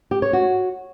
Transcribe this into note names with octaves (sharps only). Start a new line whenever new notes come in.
G4
C#5
F#4